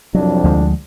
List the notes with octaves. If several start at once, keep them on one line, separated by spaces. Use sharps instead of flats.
C2 F2 F#3 D4
D2 F3 G#3